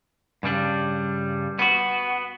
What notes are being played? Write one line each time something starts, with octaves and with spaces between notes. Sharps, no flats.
G2 C#3 G3 D4
B3 F#4